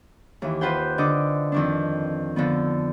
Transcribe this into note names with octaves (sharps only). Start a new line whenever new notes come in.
D#2 E3
F4 B4 C5 F#5 G5
D3 D#5 D6
F2 D#3 D4
D3 F3 B3